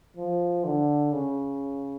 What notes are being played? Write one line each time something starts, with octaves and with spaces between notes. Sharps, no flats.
F3
D3
C#3